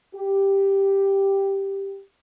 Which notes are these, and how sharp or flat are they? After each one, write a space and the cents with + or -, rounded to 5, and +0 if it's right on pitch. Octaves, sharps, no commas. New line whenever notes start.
G4 +0